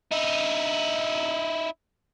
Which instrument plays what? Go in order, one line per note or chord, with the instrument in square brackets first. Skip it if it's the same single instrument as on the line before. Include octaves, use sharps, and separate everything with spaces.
[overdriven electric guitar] D#4 E4